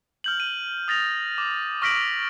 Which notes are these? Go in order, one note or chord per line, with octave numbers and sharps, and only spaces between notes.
F6 G6 F#7
D#7
D#6 A6 A#6 F7
D6
C#6 F6 A#6 B6 D7 F#7